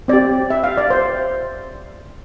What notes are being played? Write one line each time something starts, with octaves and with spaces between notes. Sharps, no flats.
C4 G4 D5
E5
F5
D5
C5